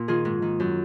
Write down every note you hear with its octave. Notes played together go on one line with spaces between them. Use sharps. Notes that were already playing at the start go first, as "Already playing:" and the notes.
Already playing: A#2
D#3 F4 G#4
G#2
D#3
F#2